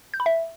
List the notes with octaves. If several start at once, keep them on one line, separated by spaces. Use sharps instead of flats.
G6
B5
E5